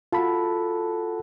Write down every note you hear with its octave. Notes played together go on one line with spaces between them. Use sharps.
F4 F#4 A4 A5 B5